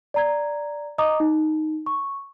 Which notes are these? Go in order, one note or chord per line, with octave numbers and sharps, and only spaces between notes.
D5 A#5 G#6
D#5 A#5 D6 D#6
D#4
C#6